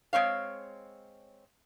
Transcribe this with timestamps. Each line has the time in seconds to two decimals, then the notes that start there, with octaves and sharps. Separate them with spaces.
0.13 G#3 C4 C#5 F5